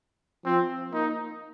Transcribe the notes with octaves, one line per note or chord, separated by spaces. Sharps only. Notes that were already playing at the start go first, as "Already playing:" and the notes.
F3 C4
A#3 D#4